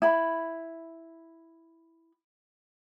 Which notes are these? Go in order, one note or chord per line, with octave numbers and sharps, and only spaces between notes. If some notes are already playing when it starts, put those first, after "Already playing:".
E4 B5